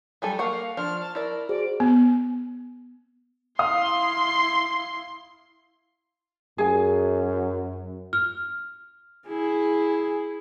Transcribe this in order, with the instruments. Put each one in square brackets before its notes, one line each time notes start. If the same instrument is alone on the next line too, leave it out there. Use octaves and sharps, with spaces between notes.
[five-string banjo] F#3 G3 A4 [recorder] G#5
[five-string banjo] A#3 F#5 [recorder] F5 [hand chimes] C#6
[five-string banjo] F3 D4 [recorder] F6
[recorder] A5
[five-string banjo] E4 D5 [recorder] A#4
[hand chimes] F#4 G#4 C5 [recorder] D5
[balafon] B3
[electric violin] E4 C6 [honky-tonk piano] F5 D#6
[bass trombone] F#2 [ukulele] G#4 G#5
[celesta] F6
[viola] E4 [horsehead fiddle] G#4